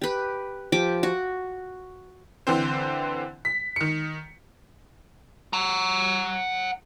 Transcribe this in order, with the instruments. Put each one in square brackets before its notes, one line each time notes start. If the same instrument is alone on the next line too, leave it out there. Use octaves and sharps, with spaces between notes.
[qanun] G4 B4
F3 G4 D6
F#4
[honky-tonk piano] D3 E3 C4 C5
B6
D#3 C#7
[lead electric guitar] F#5 A#5